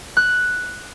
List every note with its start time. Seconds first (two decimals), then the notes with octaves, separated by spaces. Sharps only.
0.17 F#6